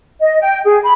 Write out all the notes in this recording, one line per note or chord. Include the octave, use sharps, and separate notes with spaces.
D#5
G5
G#4
B5